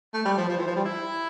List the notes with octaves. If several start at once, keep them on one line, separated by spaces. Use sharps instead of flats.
A3
G3
F3
F3
E3
F3
G3
E4